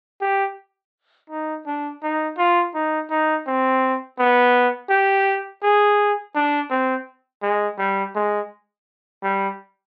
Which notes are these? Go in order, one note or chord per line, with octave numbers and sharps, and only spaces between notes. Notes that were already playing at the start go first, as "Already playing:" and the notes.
G4
D#4
D4
D#4
F4
D#4
D#4
C4
B3
G4
G#4
D4
C4
G#3
G3
G#3
G3